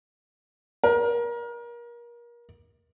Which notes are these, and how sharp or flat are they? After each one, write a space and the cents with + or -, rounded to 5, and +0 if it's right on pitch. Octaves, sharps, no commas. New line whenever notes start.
A#4 +30